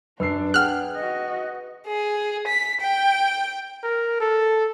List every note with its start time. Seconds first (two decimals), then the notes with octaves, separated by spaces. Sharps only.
0.20 F#2 D4 B4 E6 C7
0.54 G#4 F#5 G5 F6 F#6
0.95 F#4 D#5
1.87 G#4
2.47 B6
2.81 G5
3.83 A#4
4.20 A4